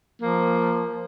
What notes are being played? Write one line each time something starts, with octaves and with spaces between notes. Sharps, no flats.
F3 A#3